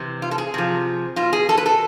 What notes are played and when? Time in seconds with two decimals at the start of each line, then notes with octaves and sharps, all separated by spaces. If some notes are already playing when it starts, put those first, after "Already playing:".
Already playing: C3 E3
0.22 F4
0.31 A4
0.38 G#4
0.54 C3 F3
1.16 B2 F4
1.33 G#4
1.49 A4
1.57 B4
1.66 A4